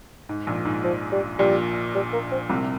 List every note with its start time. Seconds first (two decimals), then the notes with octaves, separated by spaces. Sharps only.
0.29 G#2
0.47 A#1 A#2
0.65 G#2
0.84 F3
1.12 G3
1.39 A#1 A#2 G3
1.95 G3
2.13 A#3
2.32 C4
2.50 C2 C3